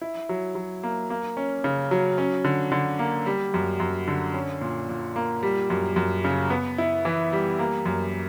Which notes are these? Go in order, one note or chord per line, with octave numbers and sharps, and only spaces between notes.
E4
F#3
F#3
A#3
A#3
C#4
C#3
F#3
C#4
D3
D3
A#3
G3
F#2
F#2
D3
C#4
A#2
A#2
A#3
G3
F#2
F#2
C#3
B3
E4
E3
G3
A#3
F#2